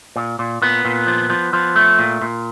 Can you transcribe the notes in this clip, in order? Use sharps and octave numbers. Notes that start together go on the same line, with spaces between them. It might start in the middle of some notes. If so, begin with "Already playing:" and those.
A#2
A#2
A#2 B3
A#2
F3
F3
F3
A3
A#2
A#2